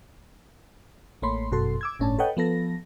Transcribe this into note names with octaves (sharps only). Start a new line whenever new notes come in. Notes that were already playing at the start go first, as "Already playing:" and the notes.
A1 A3 A#3 C#5 B5 C6
G1 F#2 B2 F#4 A4 C6
D6 E6 G#6
G1 A2 C#4 D4 A5
A4 B4 C#5 D#5 F#5 G5
F3 B3 A4 A#6